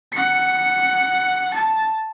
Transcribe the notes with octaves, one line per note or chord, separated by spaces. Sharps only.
F#5 C#7
A5